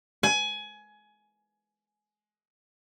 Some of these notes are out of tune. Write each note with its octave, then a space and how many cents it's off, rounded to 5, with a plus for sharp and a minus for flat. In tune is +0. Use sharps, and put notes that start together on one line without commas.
G#5 +20